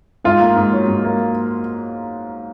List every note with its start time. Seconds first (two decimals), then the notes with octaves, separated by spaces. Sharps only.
0.24 G#2 F4
0.40 A#3
0.56 G#2
0.72 F#3
0.88 G#2
1.04 A#3